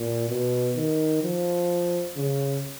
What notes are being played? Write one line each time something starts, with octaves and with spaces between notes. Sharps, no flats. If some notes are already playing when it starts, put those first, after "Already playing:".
Already playing: A#2
B2
D#3
F3
C#3